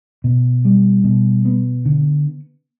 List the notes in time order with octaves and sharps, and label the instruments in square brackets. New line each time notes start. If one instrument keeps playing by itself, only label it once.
[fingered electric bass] B2
G3
B2
B3
D3